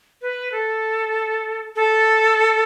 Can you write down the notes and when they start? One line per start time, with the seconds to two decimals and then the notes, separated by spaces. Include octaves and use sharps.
0.22 B4
0.52 A4
1.76 A4